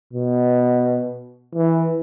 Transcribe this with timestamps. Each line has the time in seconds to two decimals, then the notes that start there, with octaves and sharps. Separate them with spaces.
0.13 B2
1.55 E3